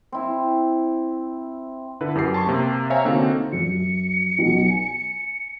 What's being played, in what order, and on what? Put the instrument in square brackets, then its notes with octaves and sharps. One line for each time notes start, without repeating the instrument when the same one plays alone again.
[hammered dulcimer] C4 E4
[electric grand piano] D3 E4 B4
F#2 G4 C7
A5 C6 C#6
C3 A#3
C5 C#5 E5 F5 G#5 A#5
D3 A#3 C4 D#4 F#4 A4
[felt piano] F#2 [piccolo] C#7
[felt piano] B1 B2
G#5